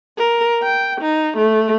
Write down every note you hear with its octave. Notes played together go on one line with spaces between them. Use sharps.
A#4
G5
D#4
A3